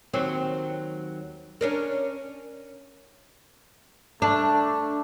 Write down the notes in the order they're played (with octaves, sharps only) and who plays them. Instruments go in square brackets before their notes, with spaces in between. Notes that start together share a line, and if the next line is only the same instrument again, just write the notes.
[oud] D#2 F#3 C4
C#4 D4 A#4
[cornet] A3 [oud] D4